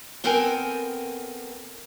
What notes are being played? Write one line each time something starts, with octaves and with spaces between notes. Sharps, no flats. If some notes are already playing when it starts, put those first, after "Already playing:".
B3 C4 A4 A#4 G5 G#5